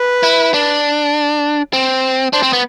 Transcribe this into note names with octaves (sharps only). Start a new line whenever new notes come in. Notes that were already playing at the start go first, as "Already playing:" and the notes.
Already playing: B4
E4
D4
C4
D4 C5
C4
B3